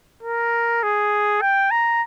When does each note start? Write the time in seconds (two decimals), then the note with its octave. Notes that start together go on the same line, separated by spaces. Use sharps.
0.23 A#4
0.83 G#4
1.41 G5
1.71 A#5